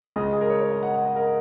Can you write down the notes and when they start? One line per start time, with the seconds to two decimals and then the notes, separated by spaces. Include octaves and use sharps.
0.16 C#2 C#3 G#3 D#5
0.33 G#4
0.41 A#4
0.50 C#5
0.61 C#5
0.72 D#5
0.83 F#5
0.94 F#5
1.05 D#5
1.16 A#4